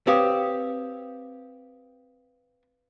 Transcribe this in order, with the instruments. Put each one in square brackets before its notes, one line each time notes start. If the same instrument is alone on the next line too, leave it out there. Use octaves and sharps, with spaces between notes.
[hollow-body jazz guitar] C4 G4 C#5 [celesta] B4 F5 D#6